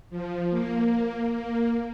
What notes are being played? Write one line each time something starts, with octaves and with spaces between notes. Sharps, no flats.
F3
A#3
A#3